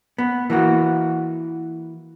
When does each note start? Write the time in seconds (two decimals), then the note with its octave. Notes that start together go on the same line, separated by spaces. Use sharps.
0.18 B3
0.50 E3 A#3 F#4